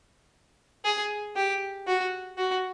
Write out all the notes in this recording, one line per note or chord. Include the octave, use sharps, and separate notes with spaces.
G#4
G4
F#4
F#4